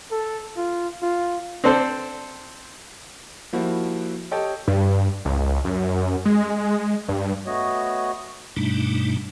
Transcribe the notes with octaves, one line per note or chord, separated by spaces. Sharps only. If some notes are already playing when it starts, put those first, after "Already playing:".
A4
F4
F4
C4 D4 A4 C5
F3 G3 A#3 E4 F#4
G4 A4 C#5 D#5 G5 A5
G2
C#2
F#2
G#3
G2
A3 B3 F#4 C#5 D#5
G2 B2 G3 A3 D4 D#4